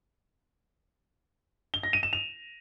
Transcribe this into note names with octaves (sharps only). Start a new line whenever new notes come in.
G7
A#6
D#7
E7
F7